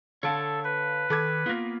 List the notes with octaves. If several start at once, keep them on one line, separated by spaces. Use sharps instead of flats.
D3 A4 C#5 F5 A5 D7
B4
D#3 A4 D6 G#6
A#3 B3 F4